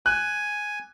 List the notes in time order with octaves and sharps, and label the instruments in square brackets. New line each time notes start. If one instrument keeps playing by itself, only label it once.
[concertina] G#5 [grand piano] F#6